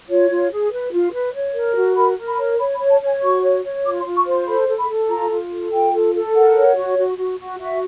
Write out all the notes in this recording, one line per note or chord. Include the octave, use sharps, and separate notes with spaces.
F4 C#5
F4
G#4
B4
F4
B4
C#5
A#4
F#4
A#4 B5
A#4
B5
C#5
C#5 B5
B5
C#5
A5
C#5
G#5
F#4 C#6
C#5
C#5
F4 D6
C6
F4
C#6
C5
C6
A4 B5
A4
B5
A4
F4 A#5
F4
A4
F4 G5
A4
A4
A#4 F#5
C#5
F#4
F#4
F#4
F#4
F#4 E5